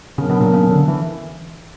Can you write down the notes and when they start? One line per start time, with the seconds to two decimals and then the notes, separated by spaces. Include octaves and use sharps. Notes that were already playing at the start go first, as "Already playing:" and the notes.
0.17 C#3 F#3 B3 D4 A#4
0.30 B2
0.41 A#2
0.53 C#3
0.71 D3
0.88 E3